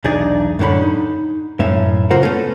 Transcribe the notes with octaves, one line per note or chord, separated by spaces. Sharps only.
B1 E2 D4 D#4 G#4 D5
F#2 A2 D3 C#4 B5
D#4
B1 F#2 A2 C#4 E5
C#3 F4 A#4 C5 F#5
A3 B3 C#4 A4